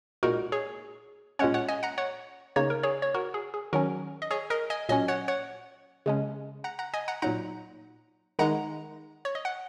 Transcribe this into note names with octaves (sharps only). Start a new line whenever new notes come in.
A#2 G#3 D#4 F#4 A#4
G#4 C#5
A#2 G#3 C#4 C#5 F#5
C#5 F#5
D#5 G#5
F#5 A#5
C#5 F#5
C#3 A#3 D#4 C#5
A#4
G#4 C#5
C#5
F#4 A#4
G#4
G#4
D#3 F#3 C#4 F#4 A#4
D#5
G#4 C#5
A#4 D#5
D#5 G#5
A#2 F#3 C#4 D#5 G#5
C#5 F#5
C#5 F#5
C#3 G#3 C#4
F#5 A#5
F#5 A#5
D#5 G#5
F#5 A#5
A#2 F#3 D#4 F#5 A#5
D#3 G#3 D#4 F#5 A#5
C#5
D#5
F#5